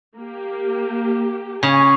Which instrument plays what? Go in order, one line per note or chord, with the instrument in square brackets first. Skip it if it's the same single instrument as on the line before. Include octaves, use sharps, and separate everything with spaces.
[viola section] A#3 G4
[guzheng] C#3 [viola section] G#5